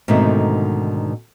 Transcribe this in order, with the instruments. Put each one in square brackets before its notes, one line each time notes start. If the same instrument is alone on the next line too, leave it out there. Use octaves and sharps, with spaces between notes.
[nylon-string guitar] G#2 B2 D3 D#3 A3 C4